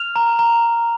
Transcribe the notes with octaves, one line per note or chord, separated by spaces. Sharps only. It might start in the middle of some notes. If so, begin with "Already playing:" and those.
Already playing: F6 F7
A#5
A#5